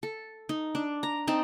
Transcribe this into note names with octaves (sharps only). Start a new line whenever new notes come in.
A4
D#4
D4
A#5
C4 D#4 A5